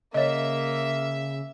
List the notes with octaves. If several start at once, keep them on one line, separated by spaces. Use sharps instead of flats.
C#3 A#3 C#5 D#5 E5